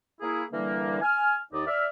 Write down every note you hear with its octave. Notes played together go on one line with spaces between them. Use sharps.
A#3 E4 G#4
D3 E3 G3 A#3
G#5 F6
D#2 D#4 D5
D5 E5 F6